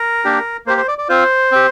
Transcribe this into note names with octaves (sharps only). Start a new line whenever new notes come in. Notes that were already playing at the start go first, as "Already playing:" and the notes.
Already playing: A#4
A#3 D4 G4
A#3 G4 C5
C5
D5
D5
C4 F4 C5
C4 G4